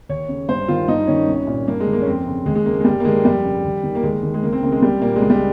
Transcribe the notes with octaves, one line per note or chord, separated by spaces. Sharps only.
D#2 C#5
C#3
G2 C5
D#3 F4
G2 D#4
D#3 C#4
C2
A#2
G2 A#3
G#3
D#3
A#3
C#4
F2 C4
C#3
D#2 G#3
G#3
C#3 A#3
G#3
G2 G3
A#3
D#3 G#3
F2 G3
C#3
D#2
D#3
A#3
D#2 G#3
D#3
G#3
C#2 A#3
C4
C#3 A#3
G#3
C2 G3
A#2 A#3
G#3
C#2
G3